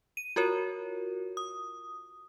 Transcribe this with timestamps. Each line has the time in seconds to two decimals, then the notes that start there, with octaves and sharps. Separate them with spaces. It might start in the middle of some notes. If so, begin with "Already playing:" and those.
0.17 D#7
0.36 F4 F#4 A#4 C#5
1.37 D#6